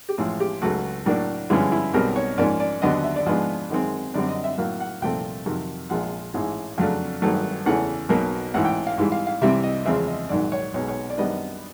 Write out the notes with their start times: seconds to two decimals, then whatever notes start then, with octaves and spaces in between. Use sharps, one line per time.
0.09 G4
0.18 A1 A2 F3 G#3 G#4
0.40 G4
0.62 C#2 C#3 F#3 A3 F#4
1.06 A2 F#3 A#3 D4
1.50 G2 D3 F3 G#3 C#4 E4
1.72 E4
1.93 B1 B2 G3 C4 A#4
2.16 C#5
2.38 G#2 F3 A#3 C#4 D5
2.60 D5
2.82 D#2 D3 F#3 B3 D4 D#5
3.04 E5
3.16 D5
3.26 G#2 F3 G#3 B3 D4 D#5
3.70 F#2 D#3 G#3 C4
4.14 F#2 D3 G3 C4 D5
4.29 D#5
4.44 E5
4.58 A2 F#3 A#3 F5
4.80 F#5
5.02 C2 A#2 F3 A3 C4 G5
5.46 F2 C3 D#3 F#3
5.90 A#1 A#2 F3 G#3 F#5
6.34 A1 G#2 E3 G#3
6.78 F2 C#3 F#3 A3 D4 F5
7.22 G#1 G2 D#3 F#3 A3
7.66 E2 C#3 E3 A3 C#4 F#5
8.09 B1 B2 F#3 A#3
8.54 A1 G#2 E3 F#5
8.65 G5
8.87 F5
8.98 G#2 E3 G3
9.12 F5
9.27 F5
9.42 C2 C3 E3 G3 C4 E5
9.64 D#5
9.85 E2 C#3 F3 G#3 C4 E5
10.08 D#5
10.29 A#1 G#2 D#3 F#3 D5
10.52 C#5
10.74 B1 B2 G#3 C#5
10.88 C#5
11.10 D5
11.17 F#2 D#3 G3 B3 D4 D#5